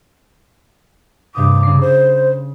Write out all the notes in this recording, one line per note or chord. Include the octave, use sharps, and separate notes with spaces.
G2 C3 D6 D#6
C#3 C7
C5